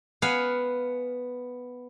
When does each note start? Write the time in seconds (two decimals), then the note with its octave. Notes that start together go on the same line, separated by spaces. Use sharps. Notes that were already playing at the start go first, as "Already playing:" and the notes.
0.22 B3 F5 F#5 G#5